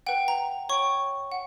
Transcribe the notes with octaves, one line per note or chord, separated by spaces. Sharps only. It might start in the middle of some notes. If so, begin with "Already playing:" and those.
B4 F#5 G5
A#5
C#5 G5 C#6
F#5